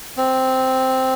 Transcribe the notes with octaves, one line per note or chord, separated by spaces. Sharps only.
C4